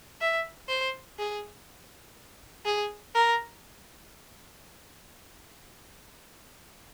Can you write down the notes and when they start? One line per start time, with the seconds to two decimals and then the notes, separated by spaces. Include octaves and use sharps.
0.21 E5
0.69 C5
1.19 G#4
2.65 G#4
3.15 A#4